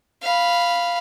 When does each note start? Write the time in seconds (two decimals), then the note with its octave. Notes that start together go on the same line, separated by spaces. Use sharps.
0.22 F5 B5